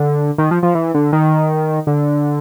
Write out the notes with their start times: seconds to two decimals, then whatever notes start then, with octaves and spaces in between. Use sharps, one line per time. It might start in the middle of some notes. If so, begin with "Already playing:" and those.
Already playing: D3
0.38 D#3
0.51 F3
0.63 F3
0.75 E3
0.94 D3
1.13 D#3
1.87 D3